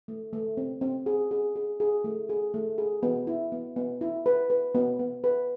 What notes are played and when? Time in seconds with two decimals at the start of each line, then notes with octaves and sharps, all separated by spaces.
0.08 A3
0.33 A3
0.57 C4
0.81 C4
1.06 G#4
1.31 G#4
1.56 G#4
1.80 G#4
2.04 A3
2.29 G#4
2.54 A3
2.78 G#4
3.03 B3
3.27 E4
3.52 B3
3.76 B3
4.01 E4
4.26 B4
4.50 B4
4.75 B3
4.99 B3
5.24 B4